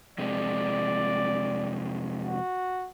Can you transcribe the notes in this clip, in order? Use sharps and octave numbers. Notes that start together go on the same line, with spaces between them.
F2 C3 G#3 D5
F#4